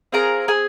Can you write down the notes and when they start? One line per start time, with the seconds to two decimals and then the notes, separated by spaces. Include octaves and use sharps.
0.12 C4 F4 G#4 A#4 A#5
0.48 G#4 G#5